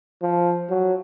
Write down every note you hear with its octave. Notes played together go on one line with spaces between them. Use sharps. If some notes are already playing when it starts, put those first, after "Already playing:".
F3
F#3